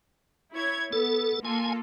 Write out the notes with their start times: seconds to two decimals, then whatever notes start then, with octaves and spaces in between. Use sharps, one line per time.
0.53 E4 C#5 G#6
0.93 B3 A4
1.45 A#3 F4 A4 G#5